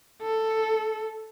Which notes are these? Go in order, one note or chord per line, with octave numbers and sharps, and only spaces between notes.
A4